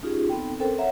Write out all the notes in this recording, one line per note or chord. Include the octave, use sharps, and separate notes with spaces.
C#4 D#4 F4 G4 G#4
B3 C4 D#4 A4 G5
C4 C#4 A4 A#4 C5 G5
C#5 E5 F#5 A#5